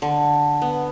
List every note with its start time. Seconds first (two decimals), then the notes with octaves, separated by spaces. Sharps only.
0.02 D3
0.62 B3